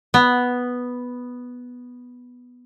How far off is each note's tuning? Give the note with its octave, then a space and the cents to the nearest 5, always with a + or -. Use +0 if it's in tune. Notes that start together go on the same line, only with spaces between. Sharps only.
B3 +0